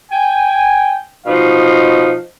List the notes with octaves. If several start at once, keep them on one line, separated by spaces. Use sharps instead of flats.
G5 G#5
B2 F3 D#4 F5